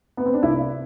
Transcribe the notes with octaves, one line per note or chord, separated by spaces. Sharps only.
B3
C4
D4
C2 E4